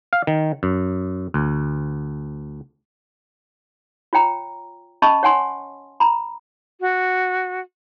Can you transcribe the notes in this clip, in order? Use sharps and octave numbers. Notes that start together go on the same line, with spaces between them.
F5
D#3
F#2
D2
F4 C#5 G5 A#5
C#4 D#5 A5 B5 C#6
C#5 F#5 G#5 C6
A#5 B5
F#4